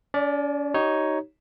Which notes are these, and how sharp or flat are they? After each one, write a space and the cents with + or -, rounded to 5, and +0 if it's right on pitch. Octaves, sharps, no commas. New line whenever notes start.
C#4 +45 D5 +0
D#4 +5 G4 -35 C#5 +0